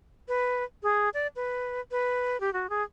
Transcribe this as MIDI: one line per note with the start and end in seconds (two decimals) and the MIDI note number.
0.28 0.64 71
0.83 1.09 68
1.14 1.27 74
1.36 1.81 71
1.91 2.39 71
2.40 2.53 67
2.53 2.69 66
2.70 2.83 68